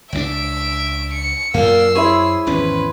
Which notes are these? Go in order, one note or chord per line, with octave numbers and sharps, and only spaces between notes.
C#2 F#3 D4 E5 D7
C#7
F#2 A#2 A#3 E6 C7
E4 G#4 C5 C#5
G#1 E2 C#4 B4